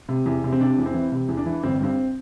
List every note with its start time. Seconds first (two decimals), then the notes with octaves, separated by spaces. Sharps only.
0.09 C3
0.26 E2
0.44 C3
0.52 C4
0.60 C3 D4
0.78 E2
0.86 C4
0.94 E3
1.12 C3
1.29 E2
1.37 D4
1.46 E3
1.63 G1 C4
1.80 G2 C4